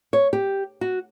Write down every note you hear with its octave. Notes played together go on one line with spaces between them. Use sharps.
C#5
G4
F#4